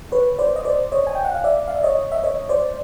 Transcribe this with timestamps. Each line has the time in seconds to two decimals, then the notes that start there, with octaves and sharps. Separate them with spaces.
0.12 B4 C#5
0.39 C5 D5
0.56 D#5
0.65 C5 D5
0.92 C#5 D#5
1.07 G#5
1.15 G5
1.25 F#5
1.34 F5
1.44 D5 E5
1.68 F5
1.75 E5
1.83 C#5 D#5
2.12 E5
2.24 C#5 D#5
2.49 C5 D5